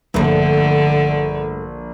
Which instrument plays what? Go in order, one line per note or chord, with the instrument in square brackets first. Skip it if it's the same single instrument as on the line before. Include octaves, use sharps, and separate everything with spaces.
[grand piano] A#1 [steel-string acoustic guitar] G2 A3 [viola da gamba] D3